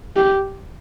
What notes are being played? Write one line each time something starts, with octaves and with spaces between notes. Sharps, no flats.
G4